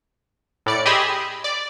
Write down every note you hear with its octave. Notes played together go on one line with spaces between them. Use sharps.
A2 D5 C#7
G4 G#4 D#5 B5 C6 E6
D5